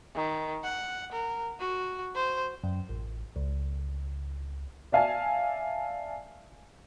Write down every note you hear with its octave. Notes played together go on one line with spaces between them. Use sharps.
D#3
F#5
A#4
F#4
C5
F#2
A1
C#2
D5 E5 F5 G#5 A5